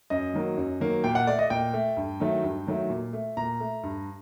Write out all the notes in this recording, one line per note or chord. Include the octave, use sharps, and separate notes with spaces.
F#2 D#5
D#3 F#3 A#3
F#2
D#3 F#3 A#3
A#2 G5
F#5
A3 D5
D#5
A#2 G5
A3
G2
D#3 F#3 A3
G2
D#3 F#3 A3
A#2
A3
A#2 A#5
A3
G2